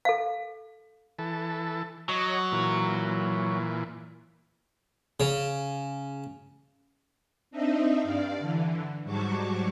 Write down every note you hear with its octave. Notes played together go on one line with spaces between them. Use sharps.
A4 F5
E3 A4
F#3 C#5 D#5
A#2 E3
C#3
C4 D4 D#4 D#5 E5
G2 D5 F5
D3 E3
G#2 F#3 G3 A5 C#6 D6